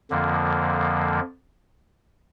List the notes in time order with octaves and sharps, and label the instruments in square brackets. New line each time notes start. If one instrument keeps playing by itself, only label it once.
[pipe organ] F2 D3 F3 A#3